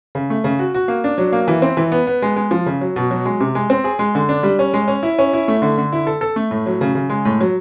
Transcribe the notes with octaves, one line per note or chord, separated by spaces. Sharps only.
C#3
A3
C#3
F#4
F#4
A#3
D4
F#3
A#3
E3
C4
E3
B3
B3
G#3
G#3
F3
C#3
F#3
B2
F#3
G#3
C3
G#3
C4
G#4
G#3
D3
D4
G3
C#4
G#3
C#4
E4
C#4
E4
A3
D3
D3
E4
A4
A4
A3
A2
F#3
C#3
C#3
G#3
A2
F#3